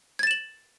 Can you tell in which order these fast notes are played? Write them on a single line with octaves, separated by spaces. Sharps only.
G#6 A6 E7 F#7